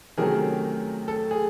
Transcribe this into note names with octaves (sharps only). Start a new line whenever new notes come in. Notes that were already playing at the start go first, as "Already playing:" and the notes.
C3 D#3 F#3 A3 C#4 G#4 A#4
A4
G#4